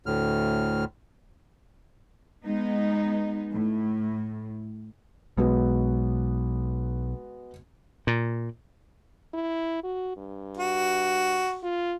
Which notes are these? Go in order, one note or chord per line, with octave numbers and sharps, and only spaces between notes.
D2 A2 F6
G#3 B3 D#4
A2
B1 G#3 B3 F#4
A#2
E4
F#4
G2
F#4
F4